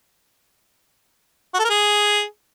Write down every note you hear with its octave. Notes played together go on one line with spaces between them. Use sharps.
F#4
A4
A#4
G#4